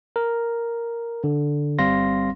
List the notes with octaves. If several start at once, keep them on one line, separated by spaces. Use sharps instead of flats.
A#4
D3
G1 G3 C4 F5 C6 A#6